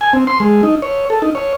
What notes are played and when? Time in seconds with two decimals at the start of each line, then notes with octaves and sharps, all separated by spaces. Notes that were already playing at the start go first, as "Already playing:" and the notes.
0.01 G#5
0.13 C4
0.27 C6
0.40 G#3
0.63 D#4
0.82 C#5
1.10 A4
1.22 D#4
1.35 C#5